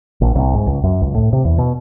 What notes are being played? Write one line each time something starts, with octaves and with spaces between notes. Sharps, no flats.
A#1
C2
G#2
C#2
F#2
C#2
A2
C3
E2
B2